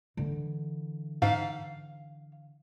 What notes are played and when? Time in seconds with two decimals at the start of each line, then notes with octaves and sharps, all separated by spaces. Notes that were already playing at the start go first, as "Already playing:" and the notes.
0.17 D3 E3
1.22 G#2 F5